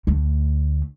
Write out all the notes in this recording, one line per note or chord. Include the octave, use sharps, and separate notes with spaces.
D2 A3